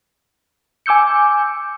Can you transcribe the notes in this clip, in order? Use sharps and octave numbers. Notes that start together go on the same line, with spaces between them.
G#5 D6 E6 G6 C#7